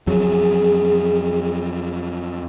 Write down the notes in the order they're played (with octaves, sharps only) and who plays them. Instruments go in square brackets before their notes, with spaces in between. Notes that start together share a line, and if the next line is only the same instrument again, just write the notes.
[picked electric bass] F2 F#3 [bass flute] G#4